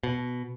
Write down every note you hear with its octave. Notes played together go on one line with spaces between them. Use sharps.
B2